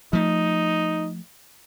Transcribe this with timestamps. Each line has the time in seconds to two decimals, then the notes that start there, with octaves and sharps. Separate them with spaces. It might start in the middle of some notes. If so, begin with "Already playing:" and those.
0.13 F3 A3 D#4